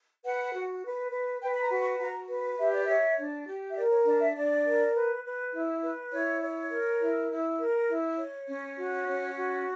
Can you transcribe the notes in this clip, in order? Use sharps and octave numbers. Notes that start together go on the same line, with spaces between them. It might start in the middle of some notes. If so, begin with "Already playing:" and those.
B4 F#5
F#4
B4
B4
B4 G5
B5
A#5
F#4
C#6
F#4 A#5
B4
G4 E5
D5
C#5 E5
D4
G4
E5
A#4 D5
C#5
D4 D5
E5
D4 D5
A#4
B4
B4
E4
B4
E4 C#5
C#5
A#4
E4
E4
A#4
E4
C#5
C#4
F#4
C#4 C#5
F#4